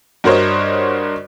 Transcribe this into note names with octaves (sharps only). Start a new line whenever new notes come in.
G2 F#4 A#4 C5 C#5 D#5